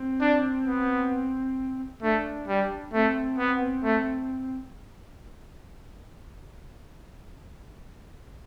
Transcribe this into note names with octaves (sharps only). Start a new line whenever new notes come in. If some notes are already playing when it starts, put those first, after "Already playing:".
Already playing: C4
D4
B3
A3 D4
G3
A3 C4
B3
A3